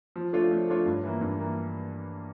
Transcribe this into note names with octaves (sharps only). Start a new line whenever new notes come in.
F3
A3 D4 F4 C#5
F3
A3 D4 F4 C#5
G2
E3 A#3
G2
E3 A#3